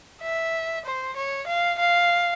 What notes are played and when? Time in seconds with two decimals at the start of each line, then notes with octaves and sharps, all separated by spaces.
0.22 E5
0.85 C5
1.16 C#5
1.47 F5
1.79 F5